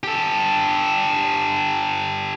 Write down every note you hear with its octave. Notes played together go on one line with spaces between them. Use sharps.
G4 A4